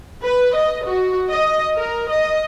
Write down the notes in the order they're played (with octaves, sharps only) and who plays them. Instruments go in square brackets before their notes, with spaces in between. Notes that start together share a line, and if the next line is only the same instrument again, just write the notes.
[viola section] B4
D#5
F#4
D#5
A#4
D#5